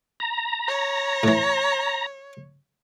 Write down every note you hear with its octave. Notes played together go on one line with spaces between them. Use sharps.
A#5
C#5
A2 E3